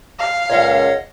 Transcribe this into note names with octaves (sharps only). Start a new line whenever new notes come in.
F5
C#2 A#2 C#5 D#5 F#5